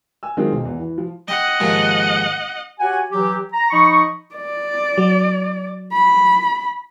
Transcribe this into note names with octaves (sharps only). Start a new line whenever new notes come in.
G#5 E6
D#3 F#3 G#3 C4 F4 G#4
B1
E2
E3
F3
D#5 F#5 G5
D#2 G#2 F3
F#4 G4 C#5 F#5 G#5
E3 F#3 G4
A#5
F3 D#4 D#5 B5 C#6
D5
F#3
B5